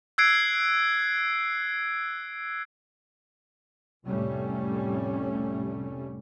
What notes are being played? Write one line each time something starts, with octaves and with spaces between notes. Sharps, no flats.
E6 F#6 G#6 C7 D7
F1 C2 A2 G3 A3 C#4